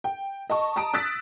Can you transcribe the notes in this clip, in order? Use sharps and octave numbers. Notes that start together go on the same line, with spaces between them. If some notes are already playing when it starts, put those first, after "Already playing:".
G5
D#5 A5 C#6
A5 A#5 D#6 D7
D#6 E6 F#6 A6 B6 D7